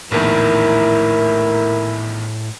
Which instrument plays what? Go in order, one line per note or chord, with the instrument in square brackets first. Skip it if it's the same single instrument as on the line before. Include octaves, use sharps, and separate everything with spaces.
[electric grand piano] A#1 E2 D#3 [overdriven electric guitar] A2 [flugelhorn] E4 [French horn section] A#4